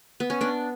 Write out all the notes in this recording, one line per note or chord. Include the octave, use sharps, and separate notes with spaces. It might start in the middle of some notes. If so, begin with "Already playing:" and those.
B3
C#4
B3 D4